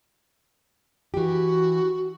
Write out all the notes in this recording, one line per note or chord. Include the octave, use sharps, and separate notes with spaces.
E3 F#4 G4